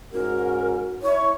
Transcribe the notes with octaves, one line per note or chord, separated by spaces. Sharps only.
G#2 C#4 F#4 A#4
E4 C#5